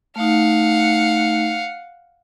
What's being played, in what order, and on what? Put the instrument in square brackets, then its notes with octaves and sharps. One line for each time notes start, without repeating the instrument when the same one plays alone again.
[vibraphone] A3 D#4 [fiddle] F5 F#5